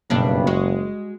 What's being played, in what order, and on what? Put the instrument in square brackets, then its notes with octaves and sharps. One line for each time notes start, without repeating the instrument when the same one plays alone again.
[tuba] F#1 [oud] G2 B2 D4
[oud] G#3 F#4